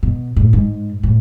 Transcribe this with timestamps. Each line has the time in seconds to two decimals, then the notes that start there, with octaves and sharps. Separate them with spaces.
0.03 B2
0.36 A2
0.53 G#2
1.03 A2